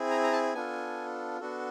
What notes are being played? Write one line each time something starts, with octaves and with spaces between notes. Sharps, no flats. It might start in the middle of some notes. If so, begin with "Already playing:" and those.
Already playing: C4 E4 G#4
A#5
A#5
A5
B3 D4 F4 A4 G#5
B3 D4 F#4 A4